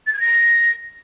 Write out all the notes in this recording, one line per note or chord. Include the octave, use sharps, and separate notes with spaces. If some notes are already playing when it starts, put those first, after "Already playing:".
A6
G#6
A#6